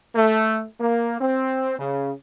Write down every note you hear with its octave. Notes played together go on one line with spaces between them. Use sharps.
A3
A#3
C4
C#3